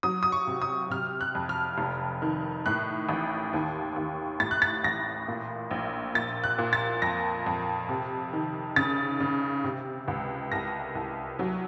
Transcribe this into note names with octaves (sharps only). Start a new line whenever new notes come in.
F#3 D#6
D#6
C#6
C3
D#6
C3 F6
F#6
F2
F6
F1
D#3
A2 F#6
A1
D#2
D#2
A2 A6
F#6
A6
A1 A#6
A#2
A#1
A#2 A6
F#6
A#2
A6
F2 A#6
F2
C3
D#3
C#3 A6
C#3
C3
C#2
C2 A#6
C2
F#3